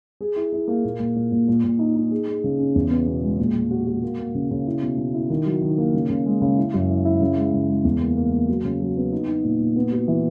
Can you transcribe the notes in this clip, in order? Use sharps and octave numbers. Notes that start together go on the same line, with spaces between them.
G#4
E4
E4
A#3
A#2
A#2
A#2
A#2
A#2
A#2
D#4
D#4
G#4
G#4
C#3
C#4
E2
B3
B2
G#3
A#2
G#3
F#4
F#4
A#3
A#3
C#3
C#3
E4
B2
B2
E4
D#3
F#3
D#3
A#3
C#3
C#3
G#3
C#3
E4
F#2
E4
E4
C#3
G#3
C#3
G#3
E2
A#3
A#3
A#3
F#3
C#3
F#3
B3
D#4
D#4
A#2
A#2
B3
F#4
E3